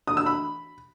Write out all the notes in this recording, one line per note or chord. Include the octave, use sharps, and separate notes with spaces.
D#6
E6
B5